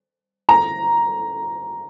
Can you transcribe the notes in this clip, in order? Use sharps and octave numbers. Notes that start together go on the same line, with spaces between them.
A#5